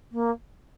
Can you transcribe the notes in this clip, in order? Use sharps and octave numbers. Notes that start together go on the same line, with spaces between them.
A#3